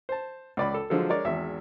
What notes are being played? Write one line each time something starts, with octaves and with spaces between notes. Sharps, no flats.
C5 A5
C#2 D5 B5
A4
D3 F3 F#3 G#3 A4
G#3 D4 A#4 C#5 D5
G#1 E2 E5